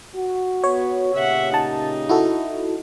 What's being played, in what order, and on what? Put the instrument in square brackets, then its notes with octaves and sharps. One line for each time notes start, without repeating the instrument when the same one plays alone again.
[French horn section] F#4
[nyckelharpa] B3 [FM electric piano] C#5
[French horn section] A#2 C#3 G4 [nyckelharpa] E5 F#5
[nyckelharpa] D#4 [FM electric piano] A5
[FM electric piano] E4 F#4 A4